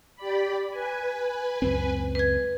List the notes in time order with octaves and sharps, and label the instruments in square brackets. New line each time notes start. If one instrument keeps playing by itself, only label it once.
[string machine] G4 D5 B5
B4 G#5
[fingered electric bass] C#2 F#2 C4
[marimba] B4 G#6